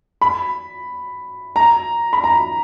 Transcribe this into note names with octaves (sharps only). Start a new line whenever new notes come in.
B5
A#5
B5
A#5